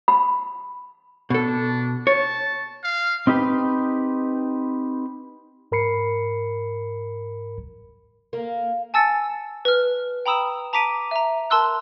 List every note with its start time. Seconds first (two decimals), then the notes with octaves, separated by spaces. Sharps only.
0.08 B5
1.30 B2 D4 A4
2.07 C#5 A5
2.84 F5
3.27 C4 D#4 G4 B4 G5
5.72 G#2 A#4 B5 C7 C#7
8.33 A#3
8.94 G#5 A5 E6 A6 C#7
9.65 B4 F6
10.26 G5 A#5 B5 D#6 E6 E7
10.73 A5 A#5 D6 B6 D7 D#7
11.11 E5 A#5
11.50 A#4 A5 C6 E6 F#6